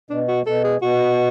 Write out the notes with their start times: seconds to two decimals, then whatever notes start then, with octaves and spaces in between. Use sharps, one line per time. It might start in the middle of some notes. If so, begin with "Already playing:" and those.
0.10 B2 D4
0.28 F#4
0.46 B2 A4
0.64 G#4
0.82 B2 F#4